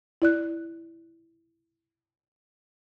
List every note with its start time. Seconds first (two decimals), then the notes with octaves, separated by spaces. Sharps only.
0.22 E4 D5 F#6